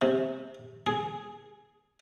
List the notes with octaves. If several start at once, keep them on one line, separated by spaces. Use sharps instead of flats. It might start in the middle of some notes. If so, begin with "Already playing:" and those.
C3
G#4